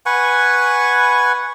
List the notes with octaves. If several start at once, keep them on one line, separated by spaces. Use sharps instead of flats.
B4 F#5 G#5 C#6